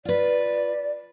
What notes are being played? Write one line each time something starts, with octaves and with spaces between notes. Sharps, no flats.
F4 B4 D5